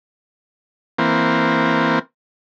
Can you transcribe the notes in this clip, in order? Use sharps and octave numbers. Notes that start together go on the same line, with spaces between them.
E3 A#3 C4